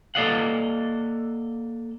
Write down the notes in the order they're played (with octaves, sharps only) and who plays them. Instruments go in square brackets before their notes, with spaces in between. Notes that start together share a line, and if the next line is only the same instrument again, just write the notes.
[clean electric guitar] A#3 A4 D5 D#5 F5 F#5